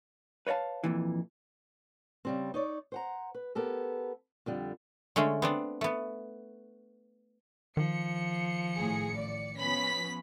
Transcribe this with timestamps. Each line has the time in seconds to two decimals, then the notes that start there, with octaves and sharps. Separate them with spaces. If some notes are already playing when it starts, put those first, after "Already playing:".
0.47 B4 C#5 D5 F5 A5
0.84 F2 A#2 E3
2.25 C#3 G3 C4
2.54 D#4 C#5 D5
2.92 C5 F#5 A#5
3.35 B4
3.55 B3 G4 A4 A#4
4.46 F2 D3 G3
5.16 D3 G#3 A3 C#4
5.42 B3 C4 D4
5.81 A3 B3
7.77 D#3 F3 C#7
8.77 A1 A2 G#4
9.16 D5
9.57 F3 B3 C#4 B5 B6